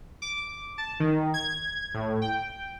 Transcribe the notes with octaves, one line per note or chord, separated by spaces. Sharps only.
D6
A5
D#3
G#6
A2
G5